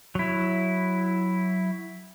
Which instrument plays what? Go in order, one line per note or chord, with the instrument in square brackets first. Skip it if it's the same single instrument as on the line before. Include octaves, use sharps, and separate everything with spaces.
[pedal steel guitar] F#3 E4